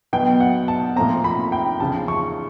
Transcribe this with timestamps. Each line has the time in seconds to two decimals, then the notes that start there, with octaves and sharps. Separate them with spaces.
0.13 B2 F#3 B3 G5
0.40 F#5
0.68 A5
0.96 A#2 F3 A3 C4 A#5
1.24 B5
1.52 G5
1.80 E2 C#3 F3 A5
2.08 C#6